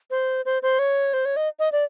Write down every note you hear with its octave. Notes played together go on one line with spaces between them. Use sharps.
C5
C5
C5
C#5
C5
C#5
D#5
D#5
D5